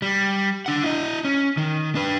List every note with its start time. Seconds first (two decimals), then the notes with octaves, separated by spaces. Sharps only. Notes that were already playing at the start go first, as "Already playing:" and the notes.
0.02 G3
0.66 D4 F#5
0.83 E4 D#5
1.25 C#4
1.57 D#3
1.95 D4 B4